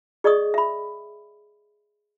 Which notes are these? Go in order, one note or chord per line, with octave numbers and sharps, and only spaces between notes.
G#4 D5 D#5 C#6 D#6
E5 B5